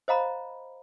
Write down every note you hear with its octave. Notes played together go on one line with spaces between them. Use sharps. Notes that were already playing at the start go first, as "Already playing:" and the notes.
C5 D#5 F5 A#5 B5